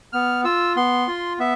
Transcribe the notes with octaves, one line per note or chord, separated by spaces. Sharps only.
B3 F6
F4 E6
B3 C6
F4
B3 E5